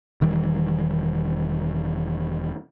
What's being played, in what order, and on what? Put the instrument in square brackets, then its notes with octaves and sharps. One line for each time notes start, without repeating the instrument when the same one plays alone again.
[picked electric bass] E1 D#3 E3 G3